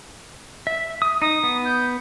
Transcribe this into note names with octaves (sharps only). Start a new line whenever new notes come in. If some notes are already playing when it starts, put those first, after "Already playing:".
E5
D#6
D#4 D#6
B3
G6